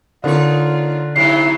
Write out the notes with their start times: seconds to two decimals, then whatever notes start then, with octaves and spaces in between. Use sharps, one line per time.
0.24 D3 A#3 D#4 F4 C#5
1.16 C3 F#3 D#4 E4 C7